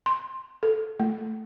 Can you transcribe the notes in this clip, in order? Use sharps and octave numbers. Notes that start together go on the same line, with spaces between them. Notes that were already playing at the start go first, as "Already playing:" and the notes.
C6
A4
A3